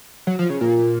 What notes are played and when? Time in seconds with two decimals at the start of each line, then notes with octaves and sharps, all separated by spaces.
0.27 F#3
0.39 F3
0.50 C#3
0.61 A#2